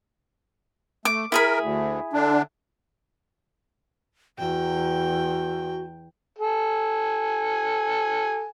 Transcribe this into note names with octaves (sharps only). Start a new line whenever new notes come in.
A3 D6
E4 G#4 A#4 B5
D2
D3 D4
E2 F#4 G5
A4 G#5